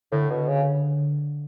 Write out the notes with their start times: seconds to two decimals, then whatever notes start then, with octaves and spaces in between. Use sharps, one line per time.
0.12 A2 D3
0.30 B2
0.48 C#3